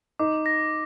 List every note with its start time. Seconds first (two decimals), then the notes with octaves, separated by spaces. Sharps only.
0.19 D#4 D6
0.46 A#6